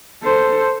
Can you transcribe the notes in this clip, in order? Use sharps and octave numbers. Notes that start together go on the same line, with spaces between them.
A4 C5